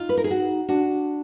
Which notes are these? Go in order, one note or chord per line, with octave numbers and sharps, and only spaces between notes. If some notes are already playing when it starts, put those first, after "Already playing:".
Already playing: D#4 F4
B4
A#4
G#4
F#4
D4 F#4